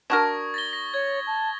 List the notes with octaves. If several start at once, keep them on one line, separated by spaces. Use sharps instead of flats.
D4 F#4 A#4 C#6 D#6 G#6
A6 A#6 G7
A#6 G7
C#5 G#6
A5